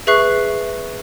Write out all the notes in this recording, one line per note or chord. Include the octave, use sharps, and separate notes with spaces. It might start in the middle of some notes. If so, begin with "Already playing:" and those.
G#4 B4 E5 C#6 F#6 C7